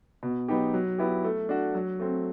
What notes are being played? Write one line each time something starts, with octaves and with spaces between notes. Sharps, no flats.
B2
F#3 B3 D#4 G4
F#3
B3 E4 G4
A3
D4 F#4
F#3
A3 C4